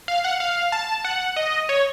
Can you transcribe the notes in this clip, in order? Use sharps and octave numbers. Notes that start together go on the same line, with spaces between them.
F5
F#5
F5
A5
F#5
D#5
C#5